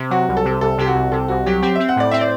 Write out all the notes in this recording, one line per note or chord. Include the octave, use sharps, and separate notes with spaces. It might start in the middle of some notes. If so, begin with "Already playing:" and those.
Already playing: C3
F#3 F#4
C2
A4
C3
C2 A4
C3 G4
F#4
C2
C3 A4
C2 F#4
F#3 G4
C4 G4
C4 E5
F#5
A2 D5
C4 E5
D5